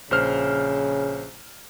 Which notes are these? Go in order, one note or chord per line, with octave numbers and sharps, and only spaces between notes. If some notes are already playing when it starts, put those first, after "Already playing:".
A#1 C#3 C5 F6